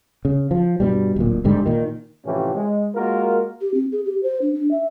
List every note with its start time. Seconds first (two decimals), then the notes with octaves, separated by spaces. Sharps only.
0.25 C#3
0.51 F3
0.80 G2 B2 G3
1.16 D1 A#2
1.44 G1 G#2 D3 G3
1.66 A#2 D#3
2.26 A2 C3 E3 F3 C#4 G4
2.55 G#3
2.96 G#3 A#3 F4 F#4 A#4
3.61 G4
3.74 C4
3.92 G#4
4.05 G4
4.23 C5
4.42 D4
4.55 D4
4.71 E5